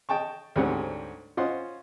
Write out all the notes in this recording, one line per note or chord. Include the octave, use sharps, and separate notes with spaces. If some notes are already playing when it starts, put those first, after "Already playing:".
D#5 G5 A5 C#6
D2 G#2 G3 C4 C#4 F#5
C#4 F4 C5 D#5 F#5 C6